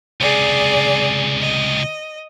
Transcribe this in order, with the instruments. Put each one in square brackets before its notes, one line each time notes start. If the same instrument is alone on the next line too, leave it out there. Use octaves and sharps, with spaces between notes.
[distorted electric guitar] C#2 C3 [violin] G#4 D5
[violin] D#5